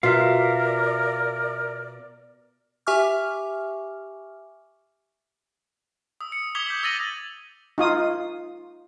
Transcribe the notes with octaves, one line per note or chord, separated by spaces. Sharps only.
B2 F4 A#4 D5 E5 F5
G4 E5 G#5 C#6 D6 F6
D#6 E6
C#7
D6 D#6 G#6 B6 F7 G7
G6 B6 F#7
D6 E6 A6 A#6 D#7 F#7
D#4 F4 D#6